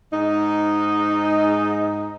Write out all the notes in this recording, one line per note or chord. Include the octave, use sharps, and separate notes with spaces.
G#2 D#4